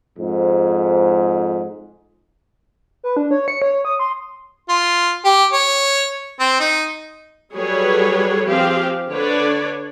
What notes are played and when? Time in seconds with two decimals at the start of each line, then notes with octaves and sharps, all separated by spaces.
0.18 F2 G#2
3.04 B4
3.17 D4
3.31 C#5
3.48 C#7
3.62 C#5
3.85 D#6
3.99 C6
4.69 F4
5.24 G4
5.53 C#5
6.40 C4
6.60 D#4
7.54 F#3 G3 G#4 A4 B4 C#5
8.46 F3 C4 G4 G#4 F5
9.10 D3 D4 B4 C#5 D5